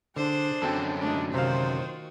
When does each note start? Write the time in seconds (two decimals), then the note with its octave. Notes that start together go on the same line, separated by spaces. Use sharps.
0.16 D3 D4 G#4 C5
0.62 F#2 D3 F#3 C4 A4
1.00 G#3 A3 D4 D#4
1.34 C3 D#3 F4 F#4 C5 F5